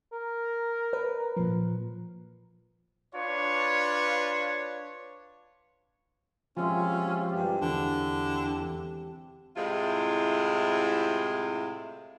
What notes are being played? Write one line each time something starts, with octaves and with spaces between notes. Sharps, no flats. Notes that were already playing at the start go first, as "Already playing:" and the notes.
A#4
B4
A#2 F3
D4 F4 B4 C#5
C3 F3 G#3 C#4 F4 E5
G2 G4
E2 D3
A2 C3 G#3 E4 F4